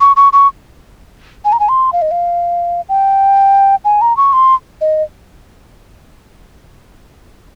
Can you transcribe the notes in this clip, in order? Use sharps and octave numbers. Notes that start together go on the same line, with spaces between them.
C#6
C#6
C#6
G#5
A#5
G#5
C6
F5
D#5
F5
G5
G#5
A#5
C#6
C6
D#5